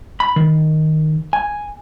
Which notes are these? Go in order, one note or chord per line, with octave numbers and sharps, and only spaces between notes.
B5
D#3
G#5